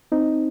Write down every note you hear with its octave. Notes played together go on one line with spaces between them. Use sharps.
C4 D#4